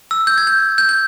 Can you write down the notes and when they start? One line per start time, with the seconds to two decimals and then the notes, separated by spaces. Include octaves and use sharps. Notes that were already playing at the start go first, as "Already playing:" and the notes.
0.11 E6
0.27 G6
0.38 G#6
0.47 G6
0.78 G6
0.89 G6